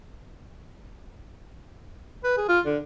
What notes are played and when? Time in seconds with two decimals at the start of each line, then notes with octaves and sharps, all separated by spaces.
2.24 B4
2.37 G#4
2.49 F4
2.66 D3